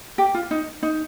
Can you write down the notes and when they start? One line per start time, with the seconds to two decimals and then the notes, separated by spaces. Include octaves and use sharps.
0.18 G4
0.35 F4
0.51 D#4
0.83 D#4